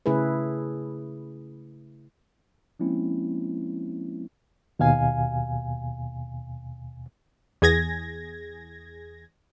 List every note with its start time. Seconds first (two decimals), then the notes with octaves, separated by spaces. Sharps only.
0.06 C#3 A3 E4 G#4 B4
2.79 F3 G#3 A#3 C4 C#4 E4
4.79 D#2 B2 F5 G#5
7.62 E2 G#4 G#6 A#6